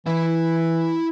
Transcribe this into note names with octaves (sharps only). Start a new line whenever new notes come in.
E3 E4 E5